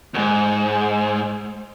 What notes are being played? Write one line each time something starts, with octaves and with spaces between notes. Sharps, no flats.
D#2 G#2